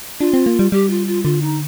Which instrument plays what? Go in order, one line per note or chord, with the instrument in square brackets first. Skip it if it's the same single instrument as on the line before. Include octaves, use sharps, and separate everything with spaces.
[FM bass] D4 [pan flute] F4
[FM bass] C4
A#3
G3
[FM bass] G3 [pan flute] G4
[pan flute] F4
F4
[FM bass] D3 [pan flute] F4
[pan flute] D#4